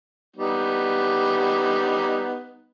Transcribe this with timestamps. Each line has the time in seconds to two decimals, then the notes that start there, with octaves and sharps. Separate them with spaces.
0.36 G3 B3 D#4